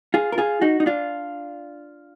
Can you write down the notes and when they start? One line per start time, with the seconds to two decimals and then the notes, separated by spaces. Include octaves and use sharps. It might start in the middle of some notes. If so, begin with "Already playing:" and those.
0.14 F4 G#4
0.32 A#4
0.38 F4 G#4
0.61 D#4 F#4
0.80 D#4
0.86 D4 F4